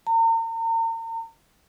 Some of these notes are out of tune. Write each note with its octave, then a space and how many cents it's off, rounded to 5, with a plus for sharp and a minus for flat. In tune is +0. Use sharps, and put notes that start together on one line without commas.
A#5 -40